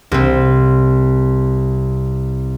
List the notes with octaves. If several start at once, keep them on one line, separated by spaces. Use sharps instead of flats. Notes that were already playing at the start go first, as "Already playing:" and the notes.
C2 C4